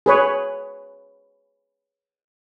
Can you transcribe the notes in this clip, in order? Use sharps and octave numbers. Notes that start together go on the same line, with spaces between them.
G#4 B4 C#5